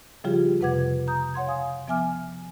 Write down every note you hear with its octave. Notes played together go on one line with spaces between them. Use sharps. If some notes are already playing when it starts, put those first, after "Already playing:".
C#3 F3 G3 F4 G4 G#4
F2 C3 B4 F#5 D6 G#6
A#5 D#6 G6
C#5 F#5 C6 G#6
F5 G#5 D#6
F3 B3 E5 G#5 D6 F6